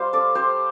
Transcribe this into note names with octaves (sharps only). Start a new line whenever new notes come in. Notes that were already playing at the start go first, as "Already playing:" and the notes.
Already playing: G3 F4 C5 F5
A4 D5
G4 C5